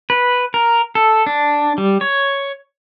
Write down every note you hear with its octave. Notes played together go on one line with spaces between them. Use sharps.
B4
A#4
A4
D4
G3
C#5